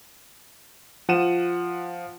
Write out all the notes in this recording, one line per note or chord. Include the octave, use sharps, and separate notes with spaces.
F3 F#5 D#7 E7